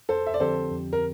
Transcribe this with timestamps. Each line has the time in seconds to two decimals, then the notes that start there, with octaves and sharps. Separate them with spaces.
0.09 F2 A4 C5
0.27 E5
0.34 D5
0.40 D3 F3 C4 G4 A4 C5
0.71 F2
0.93 A#4